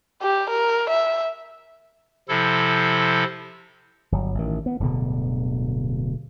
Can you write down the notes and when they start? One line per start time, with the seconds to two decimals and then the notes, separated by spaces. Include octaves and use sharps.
0.22 G4
0.50 A#4
0.90 E5
2.29 C3 F3 E4 A4
4.12 G1 F#3
4.35 A1 D#3
4.66 B3
4.80 D1 G2 B2 D3